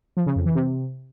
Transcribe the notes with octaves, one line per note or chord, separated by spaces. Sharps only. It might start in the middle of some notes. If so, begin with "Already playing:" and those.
F3
C#3
F2
E3
C3